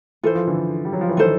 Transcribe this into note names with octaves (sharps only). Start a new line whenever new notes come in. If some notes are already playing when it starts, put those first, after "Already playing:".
E3 F4 A4 C5
F3
D3 E3
G3
F#3
F3
E3
D#3 F4 A4 C5